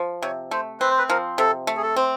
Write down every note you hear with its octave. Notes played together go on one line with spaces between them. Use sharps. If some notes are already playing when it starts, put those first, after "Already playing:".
Already playing: F3
C3 C#5
A3 C5
C4 B4
C5
B4
F3 A#4
C3 A4
A3
G#4
A4
C4